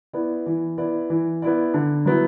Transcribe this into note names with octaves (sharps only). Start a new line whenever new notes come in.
B3 E4 D5
E3
B3 E4 D5
E3
B3 E4 D5
D3
F#3 B3 E4